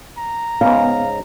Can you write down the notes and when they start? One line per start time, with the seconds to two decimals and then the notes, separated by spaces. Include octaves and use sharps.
0.18 A#5
0.61 G#2 C#3 B3 F5